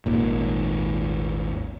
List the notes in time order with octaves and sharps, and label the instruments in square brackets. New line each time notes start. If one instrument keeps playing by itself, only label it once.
[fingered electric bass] G#1 D#2 A#2